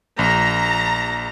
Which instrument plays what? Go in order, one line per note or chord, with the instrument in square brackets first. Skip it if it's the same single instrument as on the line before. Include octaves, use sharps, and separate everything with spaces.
[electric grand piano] A#1 [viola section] A#5